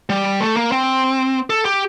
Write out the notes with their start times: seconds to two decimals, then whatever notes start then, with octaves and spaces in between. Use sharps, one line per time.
0.10 G3
0.40 A3
0.57 A#3
0.72 C4
1.50 A4
1.65 G4